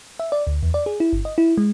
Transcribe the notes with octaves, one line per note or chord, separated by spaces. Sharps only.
E5
D5
D2
E2
D5
G#4
E4
G1
D#5
E4
G#3